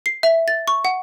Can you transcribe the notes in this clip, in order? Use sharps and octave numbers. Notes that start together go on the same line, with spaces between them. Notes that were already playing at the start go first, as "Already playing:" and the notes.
C7
E5
A6
C#6
F#5